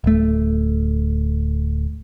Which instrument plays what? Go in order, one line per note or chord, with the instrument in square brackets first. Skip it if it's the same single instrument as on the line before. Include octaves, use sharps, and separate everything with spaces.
[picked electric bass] D1 A3